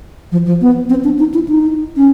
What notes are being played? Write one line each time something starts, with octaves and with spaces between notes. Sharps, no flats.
F3
F3
B3
C4
D4
D#4
E4
D#4
C#4